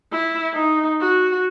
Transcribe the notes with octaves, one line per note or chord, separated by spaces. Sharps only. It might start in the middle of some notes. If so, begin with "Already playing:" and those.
E4
D#4
F#4